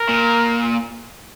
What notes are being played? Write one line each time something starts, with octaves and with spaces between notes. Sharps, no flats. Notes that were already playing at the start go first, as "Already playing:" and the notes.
Already playing: A#4
A#2